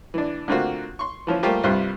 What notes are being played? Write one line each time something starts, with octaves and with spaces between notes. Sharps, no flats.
E3 D4
D3 A3 A#3 C4 F4 F#4
C6 C#6
E3 F3 C#4
G3 A3 A#3 F4 G4 C5
C2 G2 G3 F4 C5 F#6